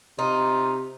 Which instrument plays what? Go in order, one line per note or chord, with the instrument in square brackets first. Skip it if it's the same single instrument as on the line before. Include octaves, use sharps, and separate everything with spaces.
[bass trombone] C3 [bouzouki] D#4 [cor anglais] F4